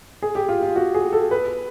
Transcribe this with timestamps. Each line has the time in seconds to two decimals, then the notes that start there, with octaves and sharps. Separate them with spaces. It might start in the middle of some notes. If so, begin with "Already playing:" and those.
0.22 G#4
0.35 G4
0.49 F4
0.63 F4
0.76 F#4
0.95 G#4
1.13 A4
1.31 B4